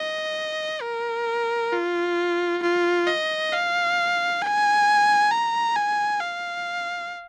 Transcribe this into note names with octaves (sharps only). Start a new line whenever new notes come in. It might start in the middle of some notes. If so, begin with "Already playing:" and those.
Already playing: D#5
A#4
F4
F4
D#5
F5
G#5
A#5
G#5
F5